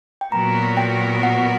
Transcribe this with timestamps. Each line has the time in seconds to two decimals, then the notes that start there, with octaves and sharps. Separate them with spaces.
0.21 G5
0.31 A#2 F#3 B3 F#4 A#4 A#5
0.77 G5
1.23 F#5